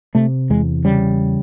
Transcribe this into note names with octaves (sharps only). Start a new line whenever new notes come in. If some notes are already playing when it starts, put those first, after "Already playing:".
C3 A3
E2 G#3
C#3 G3